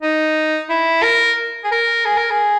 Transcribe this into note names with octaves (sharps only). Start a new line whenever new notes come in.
D#4
E4
A#4
G#4
A#4
G#4
A#4
G#4